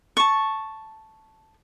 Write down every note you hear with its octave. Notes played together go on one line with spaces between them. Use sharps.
A5 C#6